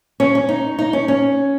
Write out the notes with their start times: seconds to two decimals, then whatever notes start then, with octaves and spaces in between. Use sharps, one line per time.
0.20 C#4
0.35 C#4
0.49 D#4
0.78 D#4
0.93 C#4
1.08 C#4